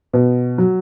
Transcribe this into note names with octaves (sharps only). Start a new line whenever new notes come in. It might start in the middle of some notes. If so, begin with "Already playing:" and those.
B2
F#3